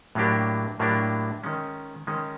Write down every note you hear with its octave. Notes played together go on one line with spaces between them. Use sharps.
A2 F#3 A#3 D4 G4
A2 F#3 A#3 D4 G4
D#3 G#3 C#4
D#3 G#3 C#4